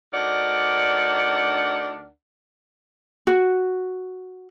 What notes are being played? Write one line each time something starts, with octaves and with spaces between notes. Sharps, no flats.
D2 D4 D#4 A#4 D5 F#5
F#4